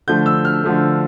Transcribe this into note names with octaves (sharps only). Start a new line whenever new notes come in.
D3 F3 A3 G6
E6
F6
D3 F3 A3